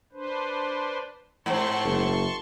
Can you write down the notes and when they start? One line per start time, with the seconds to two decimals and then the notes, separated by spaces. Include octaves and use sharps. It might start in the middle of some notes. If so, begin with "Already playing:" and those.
0.12 D4 B4 C5
1.46 G#2 C4 A5 C6 C#6
1.85 F#1